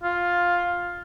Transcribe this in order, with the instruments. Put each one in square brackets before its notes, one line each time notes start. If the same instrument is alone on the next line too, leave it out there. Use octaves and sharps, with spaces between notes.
[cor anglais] F4